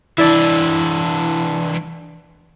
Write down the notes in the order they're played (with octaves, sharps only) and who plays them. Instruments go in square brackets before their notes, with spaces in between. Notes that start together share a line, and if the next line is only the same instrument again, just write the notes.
[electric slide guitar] E3 D4 [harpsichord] E4 D5 A5